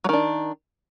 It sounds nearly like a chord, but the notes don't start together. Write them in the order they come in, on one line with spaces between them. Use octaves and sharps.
F#3 D#3 D4